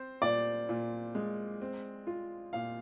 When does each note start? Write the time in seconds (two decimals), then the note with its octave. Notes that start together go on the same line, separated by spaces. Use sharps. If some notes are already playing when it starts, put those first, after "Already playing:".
Already playing: C4 C5
0.22 A#2 D5
0.69 A#2
1.15 G#3
1.61 C4
2.07 F4
2.53 A#2 F5